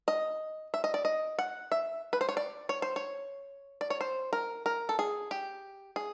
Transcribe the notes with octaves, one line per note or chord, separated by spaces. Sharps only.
D#5
E5
D#5
D5
D#5
F#5
E5
B4
C5
C#5
D5
C#5
C5
C#5
D5
C#5
C5
A#4
A#4
A4
G#4
G4
G#4